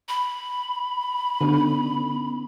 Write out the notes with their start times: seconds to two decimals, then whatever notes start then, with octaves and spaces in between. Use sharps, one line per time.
0.08 B5
1.41 D3 B3 C#4 D#4